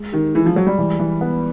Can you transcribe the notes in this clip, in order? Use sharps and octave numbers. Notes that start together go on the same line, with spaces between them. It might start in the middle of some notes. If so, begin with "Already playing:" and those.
Already playing: G#3
D#3 G4
E3 G#3
F3
F#3 G#3
G3
E3
E3
B3